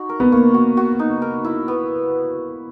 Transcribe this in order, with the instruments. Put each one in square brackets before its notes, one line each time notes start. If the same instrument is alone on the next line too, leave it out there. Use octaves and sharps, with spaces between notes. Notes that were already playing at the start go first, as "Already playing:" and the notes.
Already playing: [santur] D#4 F#4
A#4
[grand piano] B3
[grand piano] A#3 [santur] C#5
[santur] F#4
F#4
D#4
A#4
E4
B3